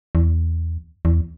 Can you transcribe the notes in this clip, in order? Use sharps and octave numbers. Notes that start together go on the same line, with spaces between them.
E2
E2